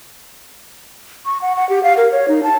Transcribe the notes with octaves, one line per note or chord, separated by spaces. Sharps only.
C#6
F#5
F#5
G4
F5
A#4
C#5
D#4
A5